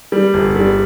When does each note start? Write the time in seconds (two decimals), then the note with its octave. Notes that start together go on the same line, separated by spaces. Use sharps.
0.12 G3
0.34 G1
0.56 G3